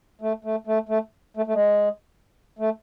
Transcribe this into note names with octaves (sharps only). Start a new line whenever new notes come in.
A3
A3
A3
A3
A3
A3
G#3
A3